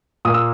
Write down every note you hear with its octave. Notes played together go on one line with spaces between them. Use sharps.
A#2 A#3 D#6
E6